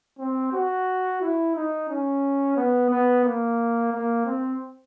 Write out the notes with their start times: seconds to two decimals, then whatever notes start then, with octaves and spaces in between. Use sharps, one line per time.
0.19 C4
0.52 F#4
1.21 E4
1.55 D#4
1.89 C#4
2.57 B3
2.90 B3
3.25 A#3
3.92 A#3
4.25 C4